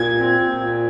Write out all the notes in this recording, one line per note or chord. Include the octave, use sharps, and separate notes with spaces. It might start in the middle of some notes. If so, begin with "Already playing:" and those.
Already playing: A#2 G#6
C4
A#2